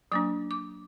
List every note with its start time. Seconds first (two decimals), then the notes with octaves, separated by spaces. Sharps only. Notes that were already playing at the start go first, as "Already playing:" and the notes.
0.12 F#3 A#3 D4 D6
0.51 D6